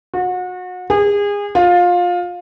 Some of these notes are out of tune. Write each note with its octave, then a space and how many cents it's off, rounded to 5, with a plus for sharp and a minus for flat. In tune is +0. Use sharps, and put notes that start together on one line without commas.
F#4 -30
G#4 -30
F4 +20